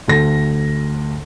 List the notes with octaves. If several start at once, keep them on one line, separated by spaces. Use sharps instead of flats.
D2 A4 A#6